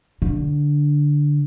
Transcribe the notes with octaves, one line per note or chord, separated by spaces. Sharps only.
D3